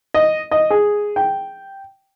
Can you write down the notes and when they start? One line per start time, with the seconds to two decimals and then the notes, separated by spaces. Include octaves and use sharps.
0.14 D#5
0.51 D#5
0.70 G#4
1.16 G5